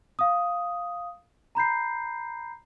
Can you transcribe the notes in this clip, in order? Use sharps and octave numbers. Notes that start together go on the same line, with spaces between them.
F5 D#6
A#5 B5 G6 C7